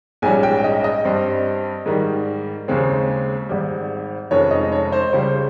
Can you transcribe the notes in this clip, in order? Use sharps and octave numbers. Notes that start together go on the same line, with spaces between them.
A#1 G#2 G3 C#4 G#5
G5
D#5
D#5
G2 G3 C4
G#2 D#3 G3
D#2 C#3 G#3 C4
G#1 G#2 G3
F1 F2 D#3 G#3 C#4 C#5
D#5
C#5
C5
C#2 C#3 G3 C5